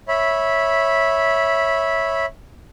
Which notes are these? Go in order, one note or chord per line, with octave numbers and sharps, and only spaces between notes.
C#5 E5 B5